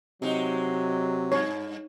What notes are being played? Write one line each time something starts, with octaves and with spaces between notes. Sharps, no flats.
C3 F#3 G#3 D#4
G2 C#5